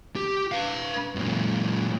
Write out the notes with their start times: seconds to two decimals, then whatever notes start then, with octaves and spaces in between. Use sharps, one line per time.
0.16 G4
0.52 B4 F5
1.15 F#2 A#2